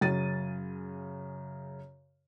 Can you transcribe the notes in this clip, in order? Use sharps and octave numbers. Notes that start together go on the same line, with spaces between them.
F#2 C#3 A6 D#7